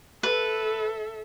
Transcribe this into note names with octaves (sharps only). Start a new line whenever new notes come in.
A4 B4 E5